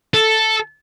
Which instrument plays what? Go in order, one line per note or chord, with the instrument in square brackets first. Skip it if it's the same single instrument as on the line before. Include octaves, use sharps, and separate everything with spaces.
[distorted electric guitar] A4